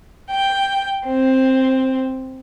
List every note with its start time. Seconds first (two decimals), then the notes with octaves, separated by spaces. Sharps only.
0.30 G5
1.05 C4